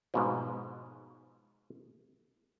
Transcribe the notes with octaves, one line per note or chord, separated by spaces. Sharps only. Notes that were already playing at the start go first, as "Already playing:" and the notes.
G#2 B2 F3